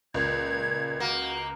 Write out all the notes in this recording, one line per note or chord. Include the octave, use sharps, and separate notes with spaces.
C#2 A#2 G#6
A#3 F#4